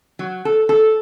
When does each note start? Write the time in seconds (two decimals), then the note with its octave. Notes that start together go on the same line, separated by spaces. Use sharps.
0.19 F#3
0.45 A4
0.69 A4